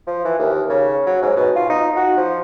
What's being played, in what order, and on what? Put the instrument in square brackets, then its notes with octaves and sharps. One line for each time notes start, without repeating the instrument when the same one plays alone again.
[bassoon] F3
E3
D#2
C#3
F#3
G#2
B2
F4
D#4
F#4
F3